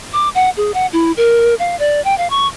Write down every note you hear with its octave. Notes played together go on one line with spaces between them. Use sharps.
D6
F#5
G#4
F#5
E4
A#4
F5
D5
G5
F5
C#6